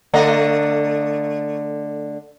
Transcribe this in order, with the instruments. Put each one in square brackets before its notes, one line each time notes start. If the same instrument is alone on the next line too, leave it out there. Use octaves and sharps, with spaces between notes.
[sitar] D3 A3 D#5